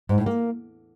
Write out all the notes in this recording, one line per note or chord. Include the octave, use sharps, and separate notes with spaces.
G#2
A2
A#3